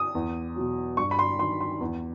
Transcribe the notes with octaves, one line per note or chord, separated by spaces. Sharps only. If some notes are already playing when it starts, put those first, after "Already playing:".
Already playing: D#6
E2
B2 F#3
G2 C#6
B5
C6
D#3 F#3 C6
C6
E2